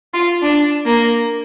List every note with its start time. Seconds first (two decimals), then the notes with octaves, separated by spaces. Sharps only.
0.14 F4
0.42 D4
0.86 A#3